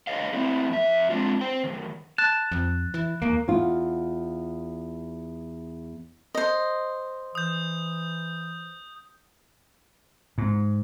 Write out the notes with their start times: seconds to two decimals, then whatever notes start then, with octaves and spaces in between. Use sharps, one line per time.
0.07 D3 B4 C#5 D#5 F5
0.33 A3 C4 E4
0.70 F2 E5
1.10 G#3 C4 D4 F4
1.41 C5 G5
1.64 F#2 D#3
2.18 A5 F#6
2.52 F2
2.94 E3
3.22 D#2 A#3
3.48 E2 F4
6.35 C5 D#5
7.35 E3 D#6 G6
10.38 G#2